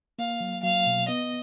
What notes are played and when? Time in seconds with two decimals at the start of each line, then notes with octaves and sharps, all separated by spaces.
0.19 A#3 F5
0.40 F#3
0.63 F#3 F5
0.86 B2
1.08 B3 D#5